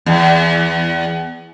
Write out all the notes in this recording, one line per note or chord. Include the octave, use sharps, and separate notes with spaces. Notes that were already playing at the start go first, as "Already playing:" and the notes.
E2